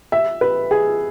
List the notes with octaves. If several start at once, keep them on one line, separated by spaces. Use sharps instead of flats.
E5
B4
G#4